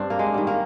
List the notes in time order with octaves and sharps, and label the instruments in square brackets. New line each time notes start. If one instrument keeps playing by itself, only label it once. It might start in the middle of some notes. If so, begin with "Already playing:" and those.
Already playing: [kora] G2 C4 D4
A#3
G#3
D#3 G3
A#3